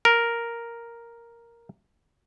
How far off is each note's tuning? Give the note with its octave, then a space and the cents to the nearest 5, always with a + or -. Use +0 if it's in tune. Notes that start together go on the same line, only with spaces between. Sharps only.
A#4 +0